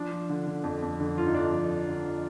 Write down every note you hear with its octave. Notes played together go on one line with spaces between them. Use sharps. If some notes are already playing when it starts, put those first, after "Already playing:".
Already playing: F3 D4
F3
D3
D3
F2
F2
D3
G1 F4
D#4
F3 D4
F2
F2
D3
F3